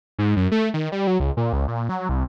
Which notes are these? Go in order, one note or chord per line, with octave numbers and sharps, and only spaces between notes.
G#2
F#2
A3
D#3
G3
F#3
C#2
A#2
C#2
A#2
F#3
C2